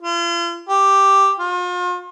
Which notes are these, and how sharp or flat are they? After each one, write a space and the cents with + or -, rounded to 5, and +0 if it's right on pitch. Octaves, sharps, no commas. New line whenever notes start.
F4 -40
G4 +0
F4 +40